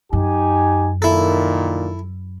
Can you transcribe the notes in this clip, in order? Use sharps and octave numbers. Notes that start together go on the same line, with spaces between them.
F#2 D#4 G4 G#5
A#1 A#2 D#3 E4 A4